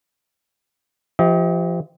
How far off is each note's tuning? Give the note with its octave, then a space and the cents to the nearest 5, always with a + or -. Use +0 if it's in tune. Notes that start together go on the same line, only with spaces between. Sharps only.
F3 -25 G4 +0 D#5 +40